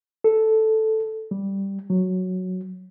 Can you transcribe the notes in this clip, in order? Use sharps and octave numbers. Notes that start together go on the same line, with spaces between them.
A4
G3
F#3